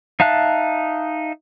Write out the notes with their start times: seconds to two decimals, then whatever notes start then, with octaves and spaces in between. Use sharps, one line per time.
0.20 D#4 E5 F5 A5 F#6